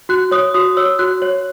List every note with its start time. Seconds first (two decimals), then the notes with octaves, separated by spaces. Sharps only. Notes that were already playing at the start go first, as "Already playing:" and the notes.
0.09 F#4 F#6
0.31 C#5 D#6
0.54 F#4 D#6
0.77 C#5 E6
0.99 F#4 F#6
1.22 C#5